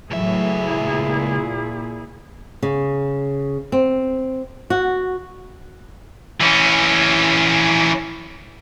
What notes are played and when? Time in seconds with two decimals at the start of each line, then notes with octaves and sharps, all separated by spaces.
0.11 C#2 A2 E3 F#3 E4 G#4 E5
0.81 A#2
2.63 C#3
3.72 C4
4.70 F#4
6.41 E3 C#4